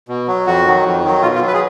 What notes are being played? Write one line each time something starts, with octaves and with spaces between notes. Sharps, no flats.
B2
F#3
F2 F#4
D#3 F#3
F2
D#3 F#3
B2 F4
F4
F#3
B4
G#4